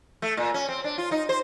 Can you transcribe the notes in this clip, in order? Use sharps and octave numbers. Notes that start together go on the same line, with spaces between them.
A3
A#2
C#4
C4
D4
F4
D#4
C5